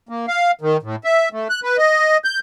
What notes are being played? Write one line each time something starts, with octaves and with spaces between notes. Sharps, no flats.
A#3
F5
D#3
A2
E5
A3
F#6
B4
D#5
G6